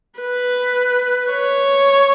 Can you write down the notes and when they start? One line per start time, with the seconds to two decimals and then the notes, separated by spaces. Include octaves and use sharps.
0.20 B4
1.32 C#5